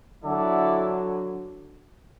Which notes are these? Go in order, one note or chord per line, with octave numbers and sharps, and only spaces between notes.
D3 F#3 E4 A4 D5 F#5